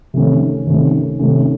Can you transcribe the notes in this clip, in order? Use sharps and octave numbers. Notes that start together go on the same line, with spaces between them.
C3 D#3 A3 C#4
C3 D#3 A3 C#4
C3 D#3 A3 C#4